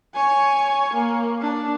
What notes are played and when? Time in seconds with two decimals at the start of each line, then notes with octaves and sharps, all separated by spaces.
0.14 C#5 G#5
0.94 A#3
1.41 D4